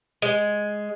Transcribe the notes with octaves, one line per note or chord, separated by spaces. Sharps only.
G#3